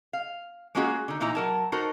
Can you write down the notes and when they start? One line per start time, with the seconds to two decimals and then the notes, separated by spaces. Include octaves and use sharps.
0.13 F5
0.75 G#3 A#3 C#4 F4 F#4 G#4
1.08 D3 D#4
1.20 A#2 E3 D#4 E4 A#5
1.35 F#3 A#4 A5
1.72 D#4 F#4 A4 A#4 C5